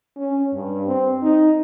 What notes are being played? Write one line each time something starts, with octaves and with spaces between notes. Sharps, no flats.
C#4
G2
C4
D#4